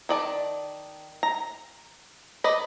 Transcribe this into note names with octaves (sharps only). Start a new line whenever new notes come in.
D#3 D5 A5
A#5
B4 D5 D#5